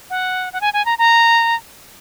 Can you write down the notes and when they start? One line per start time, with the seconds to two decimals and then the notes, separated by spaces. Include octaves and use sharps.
0.10 F#5
0.53 F#5
0.61 G#5
0.73 G#5
0.85 A#5
0.98 A#5